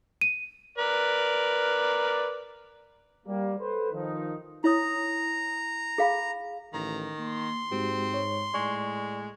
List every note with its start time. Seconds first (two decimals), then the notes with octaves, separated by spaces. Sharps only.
0.21 D#7
0.78 A#4 B4 D5
3.26 G3 A#3
3.58 A4 B4 C5
3.92 D#3 F3 D#4
4.64 E4 C#5 A#5 D#6
5.98 G#4 F5 B5
6.74 A1 D#3 A#5
7.19 A#3 C6
7.71 G#2 G#3 C4 F#4 G4
8.14 C#5
8.54 A2 G#3 D5 C#6